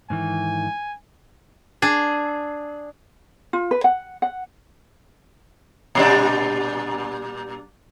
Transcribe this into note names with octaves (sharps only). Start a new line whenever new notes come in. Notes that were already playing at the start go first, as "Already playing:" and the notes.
G#2 D#3 E3 G#5
D4 G#4
F4
B4
F#5
F#5
A#2 G3 D4